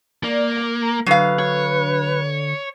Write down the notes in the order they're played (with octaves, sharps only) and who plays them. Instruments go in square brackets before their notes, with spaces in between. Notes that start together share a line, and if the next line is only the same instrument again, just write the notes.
[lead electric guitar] A#3 [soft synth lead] D5
[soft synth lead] A#5
[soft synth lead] D3 [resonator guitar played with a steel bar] F#3 F5 [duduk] B4
[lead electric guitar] C#5